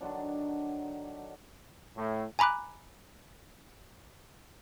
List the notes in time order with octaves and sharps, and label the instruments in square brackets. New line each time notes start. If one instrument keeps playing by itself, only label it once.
[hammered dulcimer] D3 D#3 F#3 D4
[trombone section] A2
[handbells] G#5 A#5 B5 D6 F#6